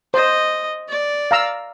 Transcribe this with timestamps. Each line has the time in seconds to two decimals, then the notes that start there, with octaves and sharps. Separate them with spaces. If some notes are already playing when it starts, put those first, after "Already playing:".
0.14 C5 D#5
0.88 D5
1.31 F5 A#5 E6